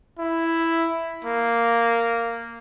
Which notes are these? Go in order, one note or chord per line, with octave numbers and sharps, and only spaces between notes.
E4
A#3